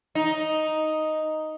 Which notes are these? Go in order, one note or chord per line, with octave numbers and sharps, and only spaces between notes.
D#4